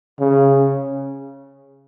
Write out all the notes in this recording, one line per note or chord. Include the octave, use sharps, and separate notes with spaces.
C#3